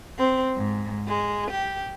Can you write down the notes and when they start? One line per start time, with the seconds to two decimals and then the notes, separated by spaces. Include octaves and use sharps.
0.20 C4
0.58 G#2
1.08 G#3
1.51 G4